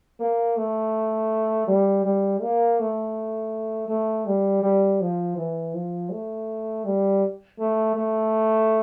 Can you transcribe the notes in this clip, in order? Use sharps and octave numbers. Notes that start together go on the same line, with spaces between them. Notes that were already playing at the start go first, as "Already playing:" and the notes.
A#3
A3
G3
G3
A#3
A3
A3
G3
G3
F3
E3
F3
A3
G3
A3
A3